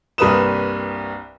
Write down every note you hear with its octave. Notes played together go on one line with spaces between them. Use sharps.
C2 G2 A#3 B4 D#6 E7